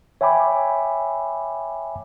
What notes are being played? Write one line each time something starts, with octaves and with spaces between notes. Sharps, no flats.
C#5 E5 G5 G#5 B5 D6